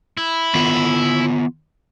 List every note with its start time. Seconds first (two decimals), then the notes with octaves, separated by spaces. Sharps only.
0.17 E4
0.55 D#3 B3 F4